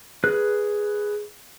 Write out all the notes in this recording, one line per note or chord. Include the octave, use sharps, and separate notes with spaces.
G#4 B4 F#6